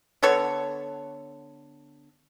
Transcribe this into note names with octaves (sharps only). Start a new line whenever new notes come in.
D3 B3 A4 C#5